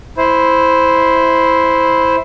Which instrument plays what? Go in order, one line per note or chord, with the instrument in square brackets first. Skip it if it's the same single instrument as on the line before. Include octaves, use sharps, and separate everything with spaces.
[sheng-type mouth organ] E4 C5